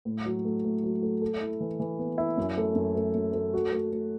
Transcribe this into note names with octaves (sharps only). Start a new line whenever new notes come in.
A2
F#3
A3
A2
F#3
A3
A4
E4
E3
E3
B3
E4
F#2
A3
F#2
A3
F#2
A3
F#4
A3
A3